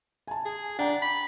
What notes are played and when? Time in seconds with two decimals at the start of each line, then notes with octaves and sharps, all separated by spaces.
0.27 G#5 A5
0.45 G#4
0.79 D4 F#5 G5 A#5
1.02 B5